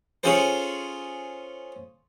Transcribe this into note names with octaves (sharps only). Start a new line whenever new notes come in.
C#4 F4 G#4 A4 C5